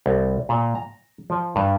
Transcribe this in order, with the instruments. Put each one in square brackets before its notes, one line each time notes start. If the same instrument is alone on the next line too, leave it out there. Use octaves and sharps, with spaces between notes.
[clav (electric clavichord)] C2
A#2
A#5
F3
G2